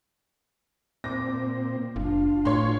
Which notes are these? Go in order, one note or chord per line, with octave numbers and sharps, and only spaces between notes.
A#2 C4 D6 A#6
F#1 D4 F4
A2 C#5 C6